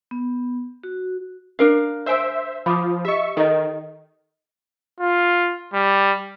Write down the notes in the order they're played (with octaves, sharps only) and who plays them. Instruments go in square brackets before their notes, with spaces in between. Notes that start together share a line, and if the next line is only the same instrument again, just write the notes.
[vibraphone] B3
F#4
[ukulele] D4 A#4 F5
[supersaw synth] C5 E5 [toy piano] C#5 G#5 E6
[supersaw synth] F3 [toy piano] B5 D6 D#6
[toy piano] G4 D#5 [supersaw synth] E5 C#6
[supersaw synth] D#3 [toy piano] A4 D#5
[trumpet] F4
G3